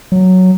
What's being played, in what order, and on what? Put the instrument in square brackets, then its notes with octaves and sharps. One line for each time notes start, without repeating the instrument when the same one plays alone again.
[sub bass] F#3